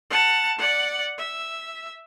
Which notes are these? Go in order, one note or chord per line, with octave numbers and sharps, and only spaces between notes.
F#5 A5
D5 F#5
E5